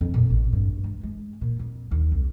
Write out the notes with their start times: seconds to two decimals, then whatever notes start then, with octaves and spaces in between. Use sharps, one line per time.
0.01 F2
0.14 A#2
0.30 A1
0.53 G2
0.84 G#3
1.03 G#3
1.41 A#2
1.59 F2
1.91 D#2
2.12 C2